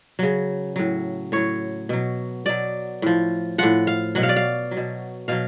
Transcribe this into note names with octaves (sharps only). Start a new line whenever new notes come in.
C#3 F#3
A2 F#3
A2 F#3 C#5
B2 F#3
B2 F#3 D5
A2 F3
A2 F3 F#5
F5
B2 F#3 F#5
F5
D5
F5
F#3
B2
B2 F#3 F5